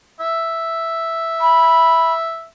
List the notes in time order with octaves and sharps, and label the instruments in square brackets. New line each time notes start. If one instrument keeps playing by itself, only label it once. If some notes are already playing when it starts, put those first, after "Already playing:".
[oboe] E5
[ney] B5